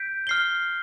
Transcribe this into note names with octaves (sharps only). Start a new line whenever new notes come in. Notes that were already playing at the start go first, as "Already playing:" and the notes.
Already playing: G6 B6 D7
F6 C7 G7